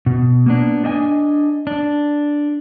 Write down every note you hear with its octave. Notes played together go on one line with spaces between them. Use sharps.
B2
A#3 B3 D4
D4 D#5 G5 G#5
D4